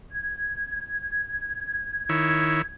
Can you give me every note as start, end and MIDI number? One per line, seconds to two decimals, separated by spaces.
0.11 2.74 92
2.09 2.62 51
2.09 2.62 64
2.09 2.62 73